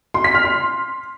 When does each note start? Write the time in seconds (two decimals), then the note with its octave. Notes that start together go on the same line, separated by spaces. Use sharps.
0.14 C6
0.24 B6
0.34 F6
0.44 C6